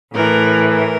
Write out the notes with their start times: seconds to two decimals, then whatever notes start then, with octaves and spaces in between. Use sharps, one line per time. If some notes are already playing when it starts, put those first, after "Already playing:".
0.13 A2 E3 A#4
0.68 A#4